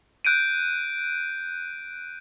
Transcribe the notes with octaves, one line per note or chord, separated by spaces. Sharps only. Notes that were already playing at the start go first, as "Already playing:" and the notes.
F#6 G6 D7 D#7